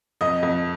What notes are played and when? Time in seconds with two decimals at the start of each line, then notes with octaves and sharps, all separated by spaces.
0.21 F2 D#5
0.43 F2